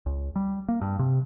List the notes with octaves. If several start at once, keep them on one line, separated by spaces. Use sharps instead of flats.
C#2
G3
A#3
G2
C3